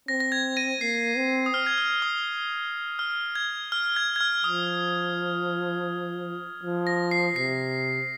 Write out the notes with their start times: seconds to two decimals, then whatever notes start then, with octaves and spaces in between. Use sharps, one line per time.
0.08 C4 A#6
0.20 A#6
0.32 G#6
0.57 A#6 D#7
0.81 A#3 C7
1.17 C4
1.46 D#6
1.54 F6
1.66 G#6
1.78 F6
2.02 D#6
2.99 F6
3.36 G#6
3.72 F6
3.96 G#6
4.16 G#6
4.21 F6
4.44 F3 D#6
6.63 F3
6.87 A#6
7.11 C7
7.36 C3 C7